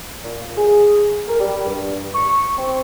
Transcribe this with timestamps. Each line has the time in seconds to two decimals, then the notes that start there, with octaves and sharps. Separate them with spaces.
0.24 A#2
0.58 G#4
1.28 A#4
1.39 G3
1.66 G2
2.14 C#6
2.58 C4